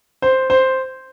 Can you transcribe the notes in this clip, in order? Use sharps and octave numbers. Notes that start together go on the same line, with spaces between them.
C5
C5